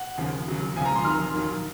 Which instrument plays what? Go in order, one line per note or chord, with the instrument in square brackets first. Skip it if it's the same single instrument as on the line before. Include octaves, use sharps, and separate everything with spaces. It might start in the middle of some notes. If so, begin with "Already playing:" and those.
Already playing: [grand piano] F#5
D#2 C#3 F3
D#2 C#3 F#3
C#2 C#3 F3 G#5
A#5
C6
F2 D#3 F#3 F6
D#2 D#3 F#3